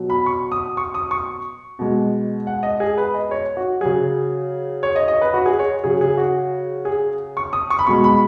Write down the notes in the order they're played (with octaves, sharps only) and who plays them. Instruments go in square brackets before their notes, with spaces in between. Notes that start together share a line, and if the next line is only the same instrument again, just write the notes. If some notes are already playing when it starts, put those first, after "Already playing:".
Already playing: [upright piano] B2 F#3
B5
C#6
D#6
C#6
D#6
C#6
B2 G#3
F#5
D#5
G#4
B4
D#5
C#5
F#4
C#3 F#3 G#4
C#5
D#5
D#5
B4
F#4
G#4
C#5
C#3 F#3 G#4
G#4
F#4
G#4
C#6
D#6
C#6
B5
B2 G#3 C#6
B5